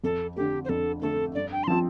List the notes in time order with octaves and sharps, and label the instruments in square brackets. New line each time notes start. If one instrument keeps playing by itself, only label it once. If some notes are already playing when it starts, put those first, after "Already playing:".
[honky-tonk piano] F2 [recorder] A4
[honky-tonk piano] D3 A3 [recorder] G4
[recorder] C5
[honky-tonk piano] F2 [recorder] A4
[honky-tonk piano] D3 A3 [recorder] A4
[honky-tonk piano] G2 [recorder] D5
[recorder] G5
C6
[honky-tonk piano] F3 C4 F4 [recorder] A5